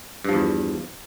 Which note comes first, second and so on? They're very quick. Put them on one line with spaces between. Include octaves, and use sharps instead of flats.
G2 F3 E2